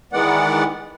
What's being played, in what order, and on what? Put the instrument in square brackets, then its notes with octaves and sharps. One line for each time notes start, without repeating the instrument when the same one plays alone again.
[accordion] D#3 E3 G#3 B3 D5 F#5